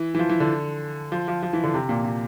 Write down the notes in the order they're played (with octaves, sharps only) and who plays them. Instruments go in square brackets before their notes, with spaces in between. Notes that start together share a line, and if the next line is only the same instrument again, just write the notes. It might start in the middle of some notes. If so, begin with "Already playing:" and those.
Already playing: [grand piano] E3
E3
F3
E3
D3
F3
F3
F3
E3
D3
C3
A#2
A#2